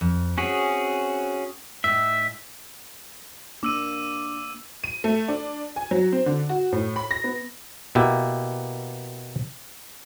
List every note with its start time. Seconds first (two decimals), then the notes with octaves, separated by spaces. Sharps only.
0.01 F2
0.38 C4 C#4 F#4 G#4
1.84 A2 D#4 E5
3.63 A#3 D4 D6 E6 D#7
4.84 D#7
5.04 A3
5.28 D4
5.76 G#5
5.91 F#3
6.13 C4
6.26 D3
6.49 F#4
6.72 A2
6.96 B5
7.11 A#6
7.24 B3
7.95 B2 A#3 E4 G4